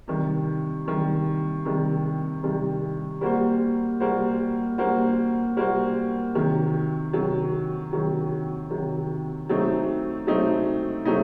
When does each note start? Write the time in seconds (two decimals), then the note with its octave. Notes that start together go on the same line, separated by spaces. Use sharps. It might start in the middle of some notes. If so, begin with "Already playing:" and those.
0.08 C3 D#3 G3
0.86 C3 D#3 G3
1.65 C3 D#3 G3
2.43 C3 D#3 G3
3.21 G3 A#3 F#4 C5
4.00 G3 A#3 F#4 C5
4.78 G3 A#3 F#4 C5
5.57 G3 A#3 F#4 C5
6.35 C3 D#3 F#3
7.13 C3 D#3 F#3
7.93 C3 D#3 F#3
8.70 C3 D#3 F#3
9.49 F#3 A3 C4 D#4
10.27 F#3 A3 C4 D#4
11.05 F#3 A3 C4 D#4